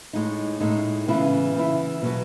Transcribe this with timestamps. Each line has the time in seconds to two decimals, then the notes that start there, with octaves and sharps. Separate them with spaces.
0.13 A2 G#3 D#4
0.61 A2 G#3 D#4
1.08 C#3 E3 B3 E4
1.55 C#3 E3 B3 E4
2.02 B2 F#3 B3 F#4